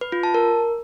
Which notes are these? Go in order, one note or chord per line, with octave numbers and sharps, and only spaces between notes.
B4
F4
A5
A#4